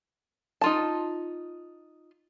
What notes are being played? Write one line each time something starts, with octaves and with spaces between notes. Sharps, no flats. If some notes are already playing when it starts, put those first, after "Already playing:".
D#4 F4 A5